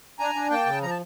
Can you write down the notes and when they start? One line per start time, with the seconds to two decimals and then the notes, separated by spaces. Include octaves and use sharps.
0.19 D4 G#5 A#5
0.35 D4
0.50 A#3 G5 A5
0.66 C#3
0.82 F3 A#5
0.90 A5